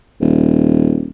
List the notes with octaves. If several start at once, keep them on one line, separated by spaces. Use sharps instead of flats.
D#1